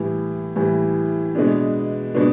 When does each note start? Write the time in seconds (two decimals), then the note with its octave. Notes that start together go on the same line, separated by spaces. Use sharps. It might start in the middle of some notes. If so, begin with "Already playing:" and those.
Already playing: A2 E3 G3
0.56 A2 E3 G3
1.35 B2 G#3 B3 D4
2.15 B2 G#3 B3 D4